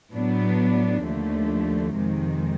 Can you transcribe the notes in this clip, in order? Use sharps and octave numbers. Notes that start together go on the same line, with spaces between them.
A2 F#3 B3 D4
D#2 D3 F3 A3
F2 C3 D#3 G#3